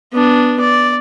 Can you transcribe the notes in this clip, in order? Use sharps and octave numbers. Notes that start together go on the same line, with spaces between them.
B3 D4
D5